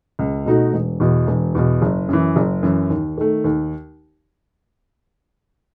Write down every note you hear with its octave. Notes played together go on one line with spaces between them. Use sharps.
C#2
B2 A3 D#4 F#4
E1
E2 B2
E1
E2 B2
F#1
F#2 E3
F#1
F#2 E3
D#2
D#3 A3
D#2